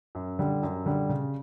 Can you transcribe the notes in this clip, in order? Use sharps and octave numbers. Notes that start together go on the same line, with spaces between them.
F#2
D3 G3
F#2
D3 G3
C#3